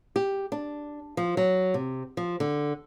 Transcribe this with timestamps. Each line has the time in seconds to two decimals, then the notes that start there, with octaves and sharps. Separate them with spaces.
0.16 G4
0.52 D4
1.17 F3
1.37 F#3
1.74 C3
2.17 F3
2.40 D3